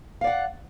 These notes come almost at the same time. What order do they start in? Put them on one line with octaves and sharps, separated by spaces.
F5 D5 F#5